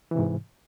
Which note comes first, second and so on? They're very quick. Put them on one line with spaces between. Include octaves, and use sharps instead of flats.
E3 C3 G#2